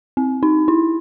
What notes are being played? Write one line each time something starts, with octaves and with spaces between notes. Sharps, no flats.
C4
D#4
E4